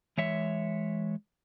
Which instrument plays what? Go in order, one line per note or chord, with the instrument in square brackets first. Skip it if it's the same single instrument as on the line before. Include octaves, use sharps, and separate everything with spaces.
[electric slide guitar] E3 G#3 C#5 E5